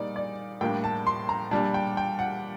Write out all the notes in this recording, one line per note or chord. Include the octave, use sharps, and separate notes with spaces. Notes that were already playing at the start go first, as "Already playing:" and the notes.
Already playing: A#2 G3 A#3 D#4 D5
D5
A2 G3 A#3 D4 G5
A5
C6
A#5
A#2 G3 D4 A5
G5
G5
F#5